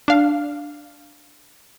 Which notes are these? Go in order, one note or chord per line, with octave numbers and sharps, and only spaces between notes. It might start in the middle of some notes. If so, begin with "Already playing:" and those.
D4 F5